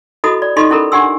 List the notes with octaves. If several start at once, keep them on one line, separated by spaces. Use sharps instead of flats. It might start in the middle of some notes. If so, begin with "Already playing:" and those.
E4 F#4 A4 D#5 B5 D#6
D5
D#4 F4 G4 A4 D#5 C6
C#4 E4 A4 A#4 B5
D4 G4 F#5 G#5 C6 E6